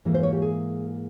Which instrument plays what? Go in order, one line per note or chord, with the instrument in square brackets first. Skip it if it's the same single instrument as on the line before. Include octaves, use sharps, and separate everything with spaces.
[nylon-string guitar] G#2 E3 G3 A#3
C5
C#5
G4
G#4